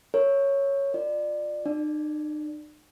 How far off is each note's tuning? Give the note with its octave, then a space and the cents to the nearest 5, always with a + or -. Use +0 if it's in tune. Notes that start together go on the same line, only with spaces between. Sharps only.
A#4 -25 C#5 +0
F4 +20 D5 +25
D#4 -45 D5 +0